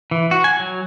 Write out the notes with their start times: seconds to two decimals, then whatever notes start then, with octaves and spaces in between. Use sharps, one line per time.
0.11 E3
0.31 F#4
0.44 G#5
0.60 F#3